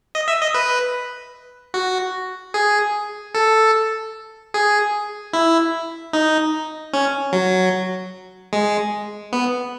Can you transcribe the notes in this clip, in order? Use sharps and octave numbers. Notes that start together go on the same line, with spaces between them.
D#5
E5
D#5
B4
F#4
G#4
A4
G#4
E4
D#4
C#4
F#3
G#3
B3